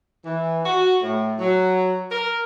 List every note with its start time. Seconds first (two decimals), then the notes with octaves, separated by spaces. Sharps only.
0.24 E3
0.65 F#4
1.02 A2
1.39 F#3
2.11 A#4